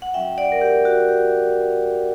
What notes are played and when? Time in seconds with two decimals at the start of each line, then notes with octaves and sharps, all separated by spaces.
0.02 F#5
0.14 F#3 C#4 F#4 E5 G5
0.38 D5 F#5
0.52 A#4
0.61 G4
0.85 F#4
1.09 G4